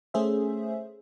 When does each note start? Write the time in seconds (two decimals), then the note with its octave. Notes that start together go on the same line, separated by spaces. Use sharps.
0.14 A3 C#4 G#4 C5 E5